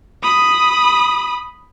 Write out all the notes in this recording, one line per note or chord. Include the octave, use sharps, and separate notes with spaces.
B5 D#6